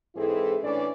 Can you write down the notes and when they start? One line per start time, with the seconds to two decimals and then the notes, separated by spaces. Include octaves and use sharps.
0.16 G#2 E3 C4 E4 G#4 A4
0.63 A2 E3 C#4 D4 D5